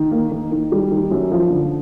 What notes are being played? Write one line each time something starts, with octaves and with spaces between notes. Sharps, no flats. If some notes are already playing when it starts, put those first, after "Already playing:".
Already playing: D#3
A#3
D#3
D#3
G3
D#3
F#2
F3
D3